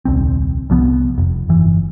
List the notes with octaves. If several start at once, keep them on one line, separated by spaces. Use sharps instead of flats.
D#1 C2 C4
C2 F3 B3
F1
G1 E3